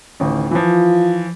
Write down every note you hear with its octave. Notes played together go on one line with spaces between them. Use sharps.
A1 D2 D#3
E3 F3 F4